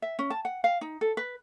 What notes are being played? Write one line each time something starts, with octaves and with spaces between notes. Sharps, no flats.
E5
C#4
A5
F#5
F5
D#4
A4
B4